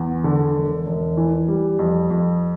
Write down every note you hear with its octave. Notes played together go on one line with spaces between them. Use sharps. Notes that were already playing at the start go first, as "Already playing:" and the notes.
Already playing: E2
D3
E1
E1
E3
G3
F2
F2